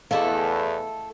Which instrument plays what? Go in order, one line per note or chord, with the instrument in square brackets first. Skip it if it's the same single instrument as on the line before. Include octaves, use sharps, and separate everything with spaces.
[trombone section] E2 [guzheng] A3 E4 F#5 [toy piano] G#4 D#5 F5 [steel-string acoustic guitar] A4